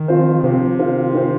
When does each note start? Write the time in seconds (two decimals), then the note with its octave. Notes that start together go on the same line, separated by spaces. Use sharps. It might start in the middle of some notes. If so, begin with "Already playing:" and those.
Already playing: D#3
0.08 F3 C4 F4 C5
0.43 C3 F3 C4 F4 C5
0.79 D#3 C4 F4 C5
1.13 D#3 C4 F4 C5